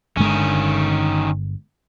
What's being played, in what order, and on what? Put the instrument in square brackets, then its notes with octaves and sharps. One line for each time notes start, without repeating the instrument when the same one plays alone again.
[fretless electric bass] G1 D3 G#3 [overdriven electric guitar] D#3 C#4